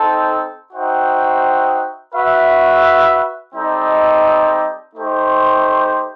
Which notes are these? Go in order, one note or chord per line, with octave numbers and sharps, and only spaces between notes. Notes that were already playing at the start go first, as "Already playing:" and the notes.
Already playing: C4 D#4 A4
D#4 F#4 C5 E5 G5
F#4 B4 E5
G3 C4 D#4 A4 D#5
A3 D#4 G4 C5